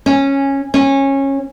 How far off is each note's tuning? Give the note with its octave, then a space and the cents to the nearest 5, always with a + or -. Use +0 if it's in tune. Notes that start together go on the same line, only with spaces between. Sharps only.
C#4 -10
C#4 -20